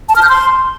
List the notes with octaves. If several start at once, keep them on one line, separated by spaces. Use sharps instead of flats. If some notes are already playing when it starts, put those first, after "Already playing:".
A5
F6
G6
C6